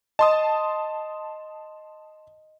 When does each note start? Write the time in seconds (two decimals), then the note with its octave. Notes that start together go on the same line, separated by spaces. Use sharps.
0.19 D#5 A5 C6 D#6